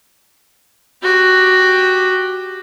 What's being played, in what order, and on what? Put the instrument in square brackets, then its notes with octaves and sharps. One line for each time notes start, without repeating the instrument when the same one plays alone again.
[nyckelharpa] F#4 G4